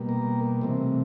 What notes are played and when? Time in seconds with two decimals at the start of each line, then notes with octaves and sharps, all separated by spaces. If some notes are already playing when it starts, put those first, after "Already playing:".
Already playing: B2 G3 A#3
0.09 A#4
0.61 C3 E3 A3 C4